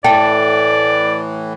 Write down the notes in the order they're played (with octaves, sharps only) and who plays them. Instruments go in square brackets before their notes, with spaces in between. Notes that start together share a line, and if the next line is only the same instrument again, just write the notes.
[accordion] A2 E3 [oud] A4 [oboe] D5 [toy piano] G5